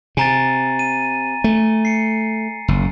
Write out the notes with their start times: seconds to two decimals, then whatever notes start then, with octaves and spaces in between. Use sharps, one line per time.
0.17 C3 G#5 A#5 A6
0.79 D#7
1.44 A3
1.85 C7 C#7
2.68 F#1